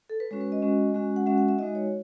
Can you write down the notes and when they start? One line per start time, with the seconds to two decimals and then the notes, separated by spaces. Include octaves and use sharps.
0.10 A4
0.20 B4
0.31 G#3 C#4 F#4 C#5
0.41 B4
0.52 D#5
0.62 G#3 C#4 F#4
0.95 G#3 C#4 F#4
1.16 F#5
1.26 G#3 C#4 F#4 E5
1.38 F#5
1.48 E5
1.58 G#3 D#4 F#4 D#5
1.75 C#5